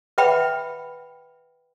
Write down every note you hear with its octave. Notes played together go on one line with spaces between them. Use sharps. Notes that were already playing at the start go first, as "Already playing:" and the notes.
B4 E5 F#5 G5 B5